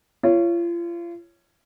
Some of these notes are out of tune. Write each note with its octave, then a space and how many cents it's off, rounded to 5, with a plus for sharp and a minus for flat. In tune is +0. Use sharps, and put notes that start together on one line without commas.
F4 -35 C#5 +0